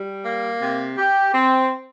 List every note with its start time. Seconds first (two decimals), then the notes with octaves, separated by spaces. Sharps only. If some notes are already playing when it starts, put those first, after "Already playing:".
Already playing: G3
0.25 A#3
0.62 C3
0.98 G4
1.34 C4